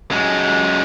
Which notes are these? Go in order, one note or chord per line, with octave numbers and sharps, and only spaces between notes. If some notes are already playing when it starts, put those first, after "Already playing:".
F#2 G#3